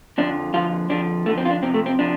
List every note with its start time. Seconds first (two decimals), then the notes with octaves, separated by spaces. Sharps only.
0.18 F2 D3 F3 D4
0.54 F2 D3 F3 F4
0.90 F2 D3 F3 D4
1.26 F2 D3 F3 A3
1.38 C4
1.45 F4
1.50 D4
1.62 F2 C3 F3 C4
1.74 A3
1.86 C4
1.99 C3 F3 D4